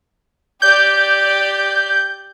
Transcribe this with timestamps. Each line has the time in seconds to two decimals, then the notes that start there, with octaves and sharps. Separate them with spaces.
0.62 G4 D5 G6